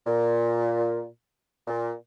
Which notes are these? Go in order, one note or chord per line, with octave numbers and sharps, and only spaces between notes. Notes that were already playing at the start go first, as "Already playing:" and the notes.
A#2
A#2